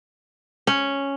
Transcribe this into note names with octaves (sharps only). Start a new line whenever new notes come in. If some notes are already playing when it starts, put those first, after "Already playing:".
C#4